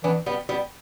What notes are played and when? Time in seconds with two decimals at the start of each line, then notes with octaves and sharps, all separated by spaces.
0.03 E3 B3 D4
0.26 G3 B3
0.49 G3 B3